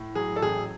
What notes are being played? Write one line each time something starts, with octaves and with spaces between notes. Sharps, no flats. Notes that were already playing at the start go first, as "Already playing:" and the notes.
Already playing: A2
F#3 G#4
A4
A1 G#4